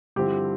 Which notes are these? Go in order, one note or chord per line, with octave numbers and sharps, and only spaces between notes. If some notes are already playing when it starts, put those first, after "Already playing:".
G2 D3 F3 C4 E4 G4